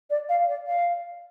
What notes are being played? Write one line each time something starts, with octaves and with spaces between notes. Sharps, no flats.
D5
F5
D5
F5